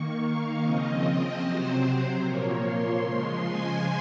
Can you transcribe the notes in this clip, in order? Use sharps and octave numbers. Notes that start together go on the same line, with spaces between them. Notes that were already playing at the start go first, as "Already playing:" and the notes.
Already playing: D#3 A#3 C#6
F5
C#3 F3 C4 D#5
C3 F#3 C4 C5
A#2 F3 A#3 C#5
C6
C#3 F3 G#3
G#5